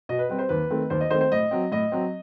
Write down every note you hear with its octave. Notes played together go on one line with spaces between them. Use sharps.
B2 D#5
B4
G3 C4 B4
C5
D#2 B4
D#3 A3 C4
D#2 C5
D#5
D#3 A3 C4 C5
C5
A2 D#5
F#3 C4
A2 D#5
F#3 C4